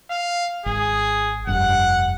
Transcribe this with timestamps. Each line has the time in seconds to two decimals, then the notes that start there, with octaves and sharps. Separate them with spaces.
0.10 F5
0.66 G#1 G#4
1.47 F1 G2 F#5